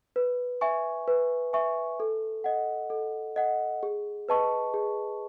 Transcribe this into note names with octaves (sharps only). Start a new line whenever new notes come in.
B4
E5 G#5 C#6
B4
E5 G#5 C#6
A4
D#5 F#5
A4
D#5 F#5
G#4
B4 D#5 A5 C#6
G#4